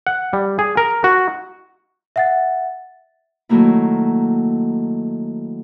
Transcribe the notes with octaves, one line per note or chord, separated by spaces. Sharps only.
F#5
G3
G#4
A#4
F#4
E5 F#5 A6
D#3 F#3 A3 A#3 E4